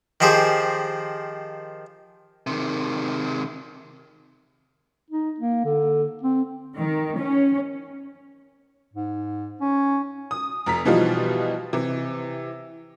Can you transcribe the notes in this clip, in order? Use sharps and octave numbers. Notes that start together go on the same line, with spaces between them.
D#3 F3 G4 G#4 C5
C3 D#3
D#4
A#3
D3
C4
D#3
C#4
G#2
C#4
D#6
F1 A#5 B6
B2 E3 F3 G3 D#4 F4
C3 E3